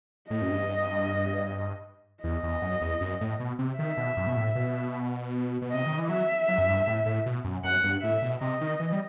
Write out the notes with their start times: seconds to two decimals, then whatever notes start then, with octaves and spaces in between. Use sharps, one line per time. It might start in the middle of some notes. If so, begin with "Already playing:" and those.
0.30 A2 D#5
0.42 F#2
0.50 G2
2.24 E2 D#5
2.43 E2
2.62 F#2
2.81 E2
3.01 F#2
3.21 A2
3.40 B2
3.59 C3
3.78 D#3 E5
3.97 B2
4.17 F#2
4.27 B2
4.36 A2
4.55 B2
5.62 B2
5.71 C3 D#5
5.86 D#3
5.98 E3
6.09 F#3 E5
6.48 F#3
6.58 F#2
6.68 G2
6.87 A2
7.06 A2
7.26 B2
7.44 F#2
7.64 F#2 F#5
7.84 G2
8.03 A2 E5
8.22 B2
8.41 C3 D#5
8.61 D#3
8.80 E3
8.92 G3